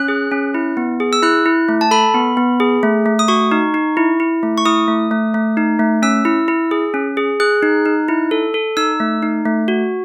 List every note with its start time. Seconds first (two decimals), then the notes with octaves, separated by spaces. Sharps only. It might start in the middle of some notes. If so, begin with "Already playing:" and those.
Already playing: C#4 F#6
0.08 G#4
0.31 C#4
0.54 E4
0.77 B3
1.00 G#4
1.13 E6
1.22 E4 F#6
1.46 E4
1.69 A3
1.81 A5
1.91 A4 B5
2.14 B3
2.37 B3
2.60 G#4
2.83 A3
3.06 A3
3.19 D#6
3.28 F#4 C#6
3.51 D#4
3.74 D#4
3.97 E4
4.20 E4
4.43 A3
4.58 C#6
4.66 E4 D#6
4.88 A3
5.11 A3
5.34 A3
5.57 D#4
5.79 A3
6.02 C#4 E6
6.25 E4
6.48 E4
6.71 G#4
6.94 C#4
7.17 G#4
7.40 G#4 F#6
7.63 D#4
7.86 D#4
8.08 E4
8.31 A4
8.54 A4
8.77 D#4 E6
9.00 A3
9.22 D#4
9.45 A3
9.68 F#4